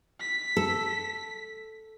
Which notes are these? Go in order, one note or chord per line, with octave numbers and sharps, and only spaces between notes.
B6
A4